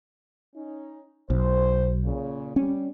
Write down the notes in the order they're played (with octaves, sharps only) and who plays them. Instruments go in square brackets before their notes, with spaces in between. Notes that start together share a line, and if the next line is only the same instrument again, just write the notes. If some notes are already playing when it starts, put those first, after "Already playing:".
[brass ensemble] C#4 D#4
[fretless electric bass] B1 [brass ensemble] C5
[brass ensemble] A#2 C#3
[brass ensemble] G3 [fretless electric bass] C#4